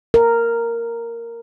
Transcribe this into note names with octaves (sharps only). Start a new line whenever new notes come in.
A#4